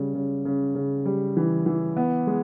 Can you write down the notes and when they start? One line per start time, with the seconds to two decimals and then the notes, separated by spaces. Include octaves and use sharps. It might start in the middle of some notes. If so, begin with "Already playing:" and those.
Already playing: C#3 G3
0.15 C#3
0.45 C#3
0.75 C#3
1.05 G3
1.37 E3
1.66 E3
1.97 B3
2.27 G#3